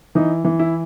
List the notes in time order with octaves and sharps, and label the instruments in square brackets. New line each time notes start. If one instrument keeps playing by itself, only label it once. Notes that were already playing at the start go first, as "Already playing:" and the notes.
[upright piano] E3 D#4
E3
E4